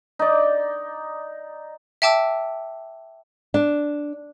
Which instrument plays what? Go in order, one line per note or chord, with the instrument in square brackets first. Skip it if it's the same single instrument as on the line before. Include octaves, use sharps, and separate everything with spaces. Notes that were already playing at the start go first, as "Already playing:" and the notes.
[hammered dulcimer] D#4 D5
[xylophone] E5 G5 A5 D6 E6
[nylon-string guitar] D4